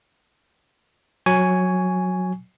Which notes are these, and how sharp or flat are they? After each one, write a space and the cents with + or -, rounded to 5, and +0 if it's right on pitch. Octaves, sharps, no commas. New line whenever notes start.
F#3 -15 G#5 +0 C#6 +15